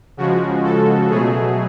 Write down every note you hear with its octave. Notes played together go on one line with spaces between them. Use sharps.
C#3 F3 G#3 F#4
A4
B2 F#3 A3 G#4